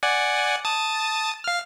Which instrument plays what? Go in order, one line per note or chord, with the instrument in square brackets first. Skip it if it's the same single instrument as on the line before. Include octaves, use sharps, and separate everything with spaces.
[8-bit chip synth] D5 F#5 G#5
A5 D#6 A6
F5 F6